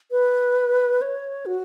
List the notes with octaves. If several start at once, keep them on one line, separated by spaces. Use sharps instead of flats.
B4
C#5
F#4